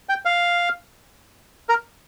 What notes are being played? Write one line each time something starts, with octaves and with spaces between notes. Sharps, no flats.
G5
F5
A#4